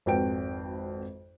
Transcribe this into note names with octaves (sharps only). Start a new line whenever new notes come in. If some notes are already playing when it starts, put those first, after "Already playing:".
G#1 F2 F#4 B4 G5 D7